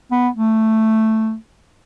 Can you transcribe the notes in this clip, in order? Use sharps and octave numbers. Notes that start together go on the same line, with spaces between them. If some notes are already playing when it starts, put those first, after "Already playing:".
B3
A3